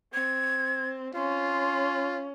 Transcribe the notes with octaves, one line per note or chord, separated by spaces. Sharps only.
C4 G#6
C#4 F4 C6